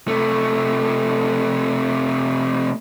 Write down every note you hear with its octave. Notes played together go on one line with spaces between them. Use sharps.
C3 A3